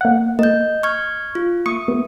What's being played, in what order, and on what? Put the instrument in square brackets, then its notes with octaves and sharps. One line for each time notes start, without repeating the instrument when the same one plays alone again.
[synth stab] A#3 F#5
[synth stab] A#3 [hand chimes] D#5 G6
[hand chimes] C#6 F6 G#6
F4
[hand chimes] A#3 D#6 [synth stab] C#6
[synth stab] B3